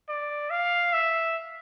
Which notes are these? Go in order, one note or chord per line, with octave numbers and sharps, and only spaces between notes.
D5
F5
E5